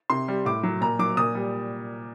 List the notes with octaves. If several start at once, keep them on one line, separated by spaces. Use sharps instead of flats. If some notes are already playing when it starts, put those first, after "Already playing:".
C3 C6
G3
A2 D6
F#3
A#2 A#5
F#3 D6
A#2 D#6
G3